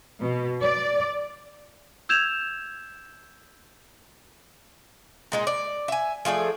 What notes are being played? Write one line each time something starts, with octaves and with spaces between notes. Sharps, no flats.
B2
D5
E6 G6 G#6 E7 F7
A#2 G#3 D#4
D5
E5 G#5
F3 A3 G#4 D5